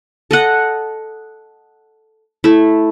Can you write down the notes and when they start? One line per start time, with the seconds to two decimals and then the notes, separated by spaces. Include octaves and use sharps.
0.31 A4 D#5 F#5
2.44 A3 E4